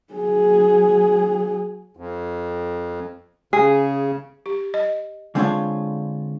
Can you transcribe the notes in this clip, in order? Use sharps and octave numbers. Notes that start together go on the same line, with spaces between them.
F#3 G#4
F2
C#3 G#4
G4
D#5
D3 G#3 C4 D4 F4 C#5